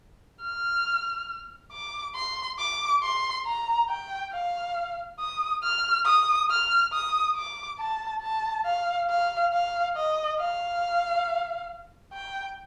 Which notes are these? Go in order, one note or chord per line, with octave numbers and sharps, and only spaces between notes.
F6
D6
C6
D6
C6
A#5
G5
F5
D#6
F6
D#6
F6
D#6
D6
A5
A5
F5
F5
F5
D#5
F5
G5